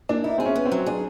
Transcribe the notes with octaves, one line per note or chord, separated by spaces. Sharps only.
A#3 D4
D#4 E4
C4 G#4
C#4
B3
C4
F#3
D4 G#4